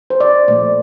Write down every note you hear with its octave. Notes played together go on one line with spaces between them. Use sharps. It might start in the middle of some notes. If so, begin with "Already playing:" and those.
C5
D5
A#2 F3 A3 D5